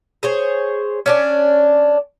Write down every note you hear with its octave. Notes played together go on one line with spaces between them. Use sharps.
G#4 C5 C#5
C#4 D4 D5